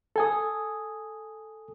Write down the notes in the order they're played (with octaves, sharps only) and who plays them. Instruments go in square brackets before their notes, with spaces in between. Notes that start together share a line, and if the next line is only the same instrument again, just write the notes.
[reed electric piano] A4 G#5 D#6